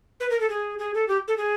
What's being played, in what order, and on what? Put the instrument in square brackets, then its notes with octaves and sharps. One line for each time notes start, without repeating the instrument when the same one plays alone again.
[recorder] B4
A#4
A4
G#4
G#4
A4
G4
A4
G#4